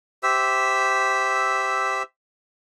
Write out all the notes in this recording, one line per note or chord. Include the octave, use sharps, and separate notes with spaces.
G4 C5 E5 E6